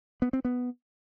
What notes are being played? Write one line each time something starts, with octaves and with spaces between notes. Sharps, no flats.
B3
C4
B3